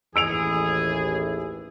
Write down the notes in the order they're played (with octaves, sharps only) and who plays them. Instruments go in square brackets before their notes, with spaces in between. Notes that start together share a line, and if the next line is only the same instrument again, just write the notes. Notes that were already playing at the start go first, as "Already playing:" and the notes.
[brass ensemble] A1 D#2 E3 [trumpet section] G#4 [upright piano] E6 D7 F7